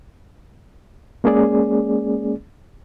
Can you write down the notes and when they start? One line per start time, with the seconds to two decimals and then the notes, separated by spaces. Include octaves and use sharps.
1.24 G#3 A#3 C#4 G#4 D5